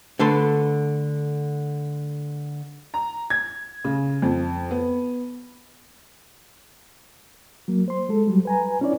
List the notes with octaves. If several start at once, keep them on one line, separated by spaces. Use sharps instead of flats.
D3 A3 A4 B4 C6
A#5
G#6
C#3
F2
B3
F#3 A#3
C5 C6
G#3 A4
F#3 G3
B4 G#5 A#5
C#4 D4 E4 C#5 D5